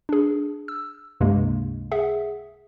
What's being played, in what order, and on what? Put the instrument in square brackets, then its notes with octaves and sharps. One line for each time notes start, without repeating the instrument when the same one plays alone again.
[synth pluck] D4 G#4
E6
C#2 G2 C3 G#3 A#3
G#4 E5 F#5